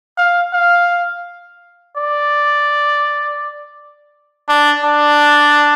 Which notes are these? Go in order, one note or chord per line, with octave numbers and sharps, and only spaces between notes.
F5
F5
D5
D4
D4